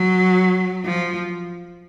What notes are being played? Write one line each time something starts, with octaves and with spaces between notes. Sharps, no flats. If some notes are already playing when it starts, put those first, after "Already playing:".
Already playing: F#3
F3